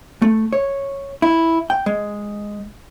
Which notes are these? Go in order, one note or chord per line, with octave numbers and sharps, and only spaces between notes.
A3
C#5
E4
G5
G#3